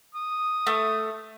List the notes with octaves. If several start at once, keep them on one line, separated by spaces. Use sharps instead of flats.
D#6
A3